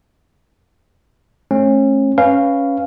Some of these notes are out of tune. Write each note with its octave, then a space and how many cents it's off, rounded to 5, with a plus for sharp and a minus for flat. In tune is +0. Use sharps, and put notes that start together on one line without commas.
A3 -25 C#4 -35
C#4 +0 B4 -5 F5 -5